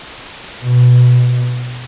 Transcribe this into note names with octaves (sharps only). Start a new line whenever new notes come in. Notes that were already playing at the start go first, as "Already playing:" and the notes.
B2